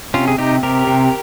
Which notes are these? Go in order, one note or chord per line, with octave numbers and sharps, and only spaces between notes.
C3 C#4 F4
G#4
C3 D#4 G4
C3 G4 A#4
C3